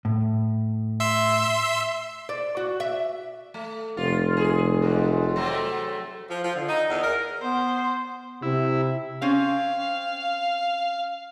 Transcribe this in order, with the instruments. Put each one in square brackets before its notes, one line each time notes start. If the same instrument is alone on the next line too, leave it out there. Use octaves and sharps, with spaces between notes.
[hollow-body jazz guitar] A2
[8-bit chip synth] E5 C6 E6
[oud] D5
F#4
E5
[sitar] A3
[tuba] F1 [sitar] F4
[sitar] G#4
F#3 G#3 A3
F#3 A3 C4
[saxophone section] F3
F3
D3
D#4
E2
A#4
[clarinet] B3 [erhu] C5
[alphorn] C3 [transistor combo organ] E4
[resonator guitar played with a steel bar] C4 C#4 [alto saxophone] F5